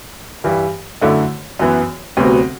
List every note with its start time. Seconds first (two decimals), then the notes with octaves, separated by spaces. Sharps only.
0.44 G2 E3 G3
1.02 F#2 D3 A3 E4
1.59 F#2 E3 B3
2.17 D2 C3 F#3 B3 F#4